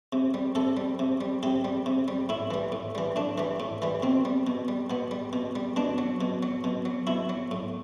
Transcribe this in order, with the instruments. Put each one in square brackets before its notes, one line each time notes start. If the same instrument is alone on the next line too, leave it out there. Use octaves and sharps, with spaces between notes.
[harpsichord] C3
G3
C3 A4
G3
C3
G3
C3 G4
G3
C3
G3
A2 E4
E3 G3
A2
E3 G3
A2 D4
E3 G3
A2
E3 G3
B2 C4
G3
B2
G3
B2 B3
G3
B2
G3
B2 D4
F#3
B2
F#3
B2
F#3
B2 E4
F#3
A2